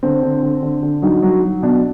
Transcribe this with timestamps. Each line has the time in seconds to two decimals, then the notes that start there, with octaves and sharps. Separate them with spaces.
0.03 D3 C4
0.23 D3
0.43 D3
0.62 D3
0.83 D3
1.02 F#3 D#4
1.23 F#3
1.43 F#3
1.62 B2 D4